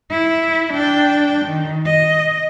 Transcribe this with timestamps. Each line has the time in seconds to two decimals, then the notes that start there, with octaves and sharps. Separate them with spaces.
0.11 E4
0.73 D4 G5
1.45 D#3
1.86 D#5